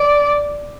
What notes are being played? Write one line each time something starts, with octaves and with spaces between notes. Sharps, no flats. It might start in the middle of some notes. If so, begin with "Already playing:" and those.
Already playing: D5